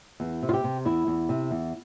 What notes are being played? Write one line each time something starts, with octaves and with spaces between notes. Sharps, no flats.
E2
C3
F4
G4
C3
E2 E4
E2
C3
E2